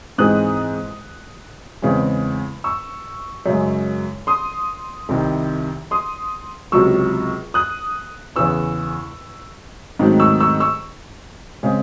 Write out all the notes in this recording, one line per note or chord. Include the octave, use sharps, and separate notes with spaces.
G#2 E3 G#3 C4 D#6 F#6
E2 C#3 G#3 C4
C#6 E6
F#2 C#3 G#3
C6 D#6
C2 C3 D#3
C6 D#6
C#2 C3 F#3 C#6 E6
D#6 F#6
E2 C#3 E3 C#6 E6
G#2 D#3 F#3 A3 C4
C#6 E6
C#6 E6
C#6 E6
C#3 G#3 C4